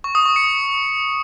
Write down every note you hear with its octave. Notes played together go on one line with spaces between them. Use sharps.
C#6
D#6
C#6
C#7